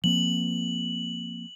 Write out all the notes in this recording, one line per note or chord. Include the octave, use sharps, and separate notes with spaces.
F3 A#3 C4 F#7